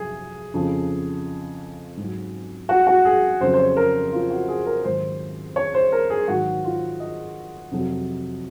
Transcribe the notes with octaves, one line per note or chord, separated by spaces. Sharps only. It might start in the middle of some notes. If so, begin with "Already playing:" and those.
Already playing: F2 C3 F#3 G#4
F2 C#3 F3
G#2 F#3
F#4
F#4
G#4
F2 C#3 F#3 C5
C5
C#5
A#4
F4
F#4
G#4
A#4
G#2 D#3 F#3 C5
C#5
C5
A#4
G#4
G#2 D#3 F#3 F#4
F4
D#5
F2 C3 F#3